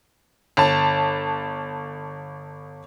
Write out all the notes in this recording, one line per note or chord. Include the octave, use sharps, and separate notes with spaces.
G1 A5